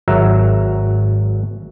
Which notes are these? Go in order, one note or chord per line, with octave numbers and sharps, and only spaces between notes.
G#1 F#3 E5 A#5